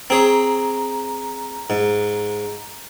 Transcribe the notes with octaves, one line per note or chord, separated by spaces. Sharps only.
C4 G#4 C#5 A#5
G#2